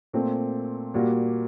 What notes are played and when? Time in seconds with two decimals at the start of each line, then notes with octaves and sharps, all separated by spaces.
0.13 A#2 A3 C4
0.94 A#2 G3 A#3 F#4